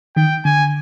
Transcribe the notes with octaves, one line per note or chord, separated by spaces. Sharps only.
D#3 G5
D3 G#5